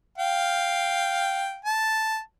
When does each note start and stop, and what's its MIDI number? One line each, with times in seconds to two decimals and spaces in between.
0.18 1.59 77
0.18 1.59 79
1.65 2.19 81